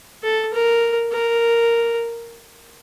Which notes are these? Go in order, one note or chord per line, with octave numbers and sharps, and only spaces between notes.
A4
A#4
A#4